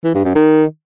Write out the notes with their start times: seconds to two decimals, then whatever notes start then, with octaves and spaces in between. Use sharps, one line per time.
0.04 E3
0.15 G2
0.25 F#2
0.35 D#3